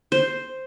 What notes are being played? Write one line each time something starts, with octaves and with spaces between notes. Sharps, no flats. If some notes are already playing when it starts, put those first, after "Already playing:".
C5